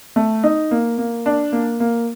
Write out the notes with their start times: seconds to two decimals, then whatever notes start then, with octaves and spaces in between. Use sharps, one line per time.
0.16 A3
0.44 D#4
0.71 A#3
0.98 A#3
1.26 D4
1.52 A#3
1.80 A#3